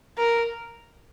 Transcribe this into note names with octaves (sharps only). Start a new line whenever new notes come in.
A#4